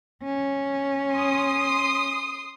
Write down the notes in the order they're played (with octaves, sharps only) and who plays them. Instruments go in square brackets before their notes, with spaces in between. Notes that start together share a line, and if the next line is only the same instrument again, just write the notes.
[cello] C#4
[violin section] C6 D#6